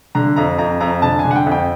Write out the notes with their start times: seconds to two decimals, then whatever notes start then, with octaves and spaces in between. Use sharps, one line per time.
0.15 D3 A#5
0.36 F2 A#5
0.58 F2 A#5
0.80 F2 A#5
1.02 D3 A5
1.19 G#5
1.25 D3
1.31 F#5
1.36 G5
1.46 F2
1.52 G5